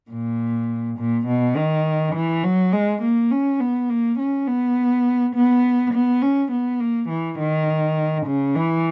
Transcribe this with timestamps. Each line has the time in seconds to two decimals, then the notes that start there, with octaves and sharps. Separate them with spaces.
0.11 A#2
0.98 A#2
1.27 B2
1.56 D#3
2.14 E3
2.43 F#3
2.72 G#3
3.02 A#3
3.31 C#4
3.60 B3
3.89 A#3
4.19 C#4
4.47 B3
5.35 B3
5.93 B3
6.22 C#4
6.51 B3
6.80 A#3
7.09 E3
7.39 D#3
8.26 C#3
8.55 E3